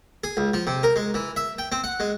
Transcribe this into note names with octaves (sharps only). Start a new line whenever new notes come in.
G#4
C#2
F3
C3
A#4
G#3
E3
E5
G5
C4
F#5
G#3